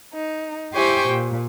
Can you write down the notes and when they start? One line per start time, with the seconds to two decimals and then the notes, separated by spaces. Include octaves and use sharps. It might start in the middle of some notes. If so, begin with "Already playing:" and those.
0.12 D#4
0.74 E4 G4 C5 G5 G#5 C#6
1.08 A#2